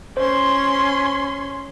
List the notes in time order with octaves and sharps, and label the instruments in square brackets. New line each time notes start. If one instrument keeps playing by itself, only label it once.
[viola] C#4 C6 [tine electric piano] C5